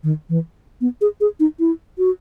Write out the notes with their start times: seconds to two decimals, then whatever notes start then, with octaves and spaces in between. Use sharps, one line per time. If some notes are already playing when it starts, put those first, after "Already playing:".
0.03 D#3
0.29 E3
0.81 B3
1.01 G#4
1.21 G#4
1.40 D#4
1.59 E4
1.98 F#4